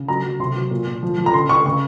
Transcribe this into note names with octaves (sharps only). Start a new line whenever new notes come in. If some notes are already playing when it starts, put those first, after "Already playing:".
Already playing: C#3
F#3 A#5
F#3
C3 C6
F#3
A#2
A#2
F3
F3
A#5
C#3 C6
C#3 C#6
C#3 C#6